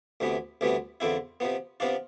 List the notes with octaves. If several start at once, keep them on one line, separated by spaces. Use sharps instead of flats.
D2 C3 E3 B3
D2 C3 E3 G3 B3
E2 D3 F3 C4 E4
C3 F3 B3
C3 F3 B3 D4 F4